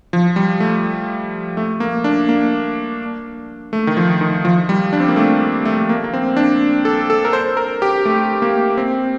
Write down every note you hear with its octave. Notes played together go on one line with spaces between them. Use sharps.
F3
G3
A3
A3
A#3
D4
A#3
A3
D#3
F3
D#3
F3
G3
D4
C4
A#3
A3
A3
A#3
A#3
C4
D4
A4
A4
A#4
C5
A#4
G4
A3
A#3
C4